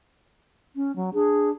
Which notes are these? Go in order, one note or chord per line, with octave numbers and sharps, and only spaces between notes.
C#4
F#3
D4 G#4